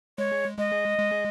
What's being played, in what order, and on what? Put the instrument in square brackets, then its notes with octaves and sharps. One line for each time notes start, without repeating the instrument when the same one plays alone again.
[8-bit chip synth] G#3 [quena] C#5
[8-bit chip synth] G#3 [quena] D#5
[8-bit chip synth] G#3